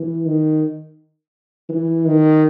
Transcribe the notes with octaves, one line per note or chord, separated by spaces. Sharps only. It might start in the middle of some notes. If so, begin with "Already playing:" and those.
Already playing: E3
D#3
E3
D#3